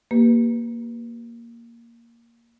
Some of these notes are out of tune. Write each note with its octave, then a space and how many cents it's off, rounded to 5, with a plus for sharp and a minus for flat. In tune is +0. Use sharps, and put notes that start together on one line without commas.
A#3 +0 G4 +0 B4 +0